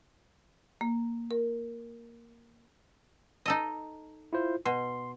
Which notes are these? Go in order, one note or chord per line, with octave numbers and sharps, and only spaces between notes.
A#3
A#4
D#4 A4 D#5
E4 F4 C5
B2 C6